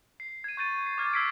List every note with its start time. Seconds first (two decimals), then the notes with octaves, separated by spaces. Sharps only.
0.20 C7
0.44 G#6 D#7
0.57 C#6 G6 A6 D#7
0.86 C7
0.98 D6 F6 G#6 A6
1.13 E6 G#6 B6 C7 D7